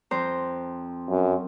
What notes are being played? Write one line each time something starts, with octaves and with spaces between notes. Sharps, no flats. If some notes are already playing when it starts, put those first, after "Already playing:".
F2 C5 A#5
F#2